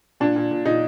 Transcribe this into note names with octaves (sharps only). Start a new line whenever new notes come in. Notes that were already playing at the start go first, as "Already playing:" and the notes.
A#2 D4
A#2
A#2
A#2 D#4